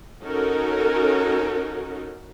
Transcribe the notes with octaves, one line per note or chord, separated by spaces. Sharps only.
C#4 D#4 F#4 A4 A#4